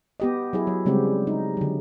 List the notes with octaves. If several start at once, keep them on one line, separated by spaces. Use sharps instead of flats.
B3 G4 D#5
F#3 E4 G#4
F#3
C#3 G3 G#3 C4 G4
D#4
D3 F#3